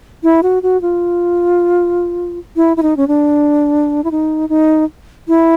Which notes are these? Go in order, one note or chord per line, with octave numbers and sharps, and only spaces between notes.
E4
F#4
F#4
F4
E4
E4
D#4
C#4
D4
E4
D#4
D#4
E4